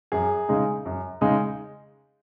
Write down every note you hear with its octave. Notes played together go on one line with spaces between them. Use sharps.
F#2 G#4
C#3 G#3 D#4
F#2
C#3 G#3 D#4